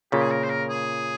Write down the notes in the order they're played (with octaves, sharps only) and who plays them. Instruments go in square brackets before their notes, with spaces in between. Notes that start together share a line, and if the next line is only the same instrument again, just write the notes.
[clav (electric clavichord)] A#2 C#3 [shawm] G4
[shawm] G#4
A#4
C5
A#4
G#4